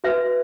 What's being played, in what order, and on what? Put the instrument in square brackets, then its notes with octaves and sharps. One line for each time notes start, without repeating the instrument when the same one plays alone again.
[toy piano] F#4 B4 E5